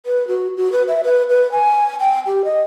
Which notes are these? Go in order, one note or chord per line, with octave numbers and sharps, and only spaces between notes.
B4
F#4
F#4
B4
E5
B4
B4
G#5
G5
G4
D#5